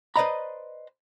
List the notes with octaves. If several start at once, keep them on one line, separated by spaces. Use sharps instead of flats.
B4 C5 D5 D#5 A#5 B5